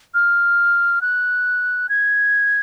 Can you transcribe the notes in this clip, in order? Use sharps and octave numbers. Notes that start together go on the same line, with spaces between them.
F6
F#6
G#6